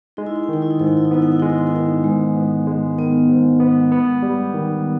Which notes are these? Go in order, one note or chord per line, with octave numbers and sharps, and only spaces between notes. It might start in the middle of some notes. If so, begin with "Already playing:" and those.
G#3 D#4
E4
D#4
E4
D#3 D#4
E4
D#4
G#2 E4
D#4
E4
D#4
B3 E4
D#4
E4
G#3 D#4
E4
D#4
E4
D#3 D#4
G#2 G#3
B3
G#3
D#3 B3
G#2
B3
B3
G3
D#3